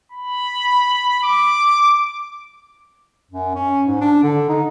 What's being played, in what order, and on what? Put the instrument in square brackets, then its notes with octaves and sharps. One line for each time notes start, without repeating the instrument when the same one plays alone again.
[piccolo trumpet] B5
D6
[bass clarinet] F#2
C#4
G#2
D4
D3
D#4